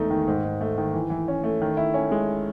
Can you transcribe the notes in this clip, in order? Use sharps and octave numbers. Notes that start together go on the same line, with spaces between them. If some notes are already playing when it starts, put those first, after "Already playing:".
Already playing: E2 G#3 A3 D#4
D#3
G#2
G#2
A3
D#3
E3
E3
C#4
A3
D#3
E4
C#4
G#3